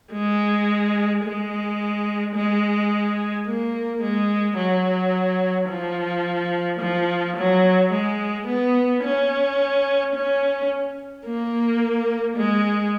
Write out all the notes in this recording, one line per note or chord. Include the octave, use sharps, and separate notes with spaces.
G#3
G#3
G#3
A#3
G#3
F#3
F3
F3
F#3
G#3
B3
C#4
C#4
A#3
G#3